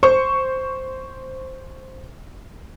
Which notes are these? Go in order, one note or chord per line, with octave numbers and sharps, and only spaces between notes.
C5 C#6